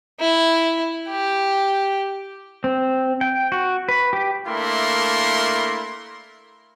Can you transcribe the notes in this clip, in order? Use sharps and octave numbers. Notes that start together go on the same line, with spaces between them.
E4
G4
C4
G5
F#4
B4
G4
A3 A#3 D4 E4 A#4 C6